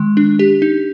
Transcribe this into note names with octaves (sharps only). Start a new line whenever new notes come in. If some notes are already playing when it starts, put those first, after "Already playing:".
Already playing: D#3 G#3
D4
G4
D#4